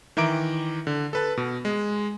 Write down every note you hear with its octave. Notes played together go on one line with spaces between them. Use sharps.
D#3 E3 E5 A#5 D6 D7
D3
A4 B4 A5
B2
G#3